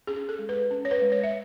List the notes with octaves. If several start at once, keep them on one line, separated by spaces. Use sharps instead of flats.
C#4 G#4
A4
G#3
B4
C#4
C#5
B4
G#3
C#5
E5